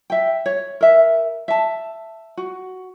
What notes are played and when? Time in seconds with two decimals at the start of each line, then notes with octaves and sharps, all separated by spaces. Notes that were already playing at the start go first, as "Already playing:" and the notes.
0.10 E5 G5
0.46 C#5
0.81 A#4 E5
1.48 E5 A5
2.37 F#4